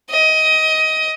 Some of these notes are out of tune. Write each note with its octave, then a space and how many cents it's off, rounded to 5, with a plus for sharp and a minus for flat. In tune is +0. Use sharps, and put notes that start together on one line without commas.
D#5 +20